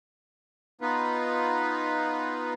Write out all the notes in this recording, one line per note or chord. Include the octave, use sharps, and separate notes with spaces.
B3 D#4 F4 B4